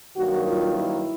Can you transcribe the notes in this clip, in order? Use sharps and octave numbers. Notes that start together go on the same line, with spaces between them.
G2 D#3 F#3 A#3 F#4
F4
E4